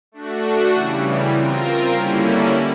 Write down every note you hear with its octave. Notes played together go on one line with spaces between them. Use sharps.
A3 D4 F#4
C#3 E3 G3
C4 F4 A#4
D3 G3 A#3 C#4 E4